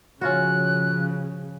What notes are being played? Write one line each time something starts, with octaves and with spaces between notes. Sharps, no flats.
C#3 F3 C#4 F4 F#4 F#6